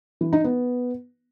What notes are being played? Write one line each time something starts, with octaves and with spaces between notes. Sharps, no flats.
E3
D#4
B3